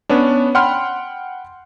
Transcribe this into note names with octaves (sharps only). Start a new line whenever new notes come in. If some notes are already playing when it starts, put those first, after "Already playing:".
B3 C#4 D4
F#5 G5 B5 C6 F6